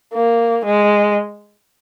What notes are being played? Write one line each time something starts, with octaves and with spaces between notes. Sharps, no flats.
A#3
G#3